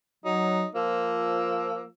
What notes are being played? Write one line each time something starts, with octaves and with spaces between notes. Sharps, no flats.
F#3 D#4
F3 A#3 E6